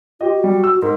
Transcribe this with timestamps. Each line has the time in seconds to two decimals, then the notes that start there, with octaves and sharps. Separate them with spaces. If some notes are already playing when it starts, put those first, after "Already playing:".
0.21 F4 G4 D#5
0.32 F#4
0.44 G3
0.64 E6
0.82 G#2 A#4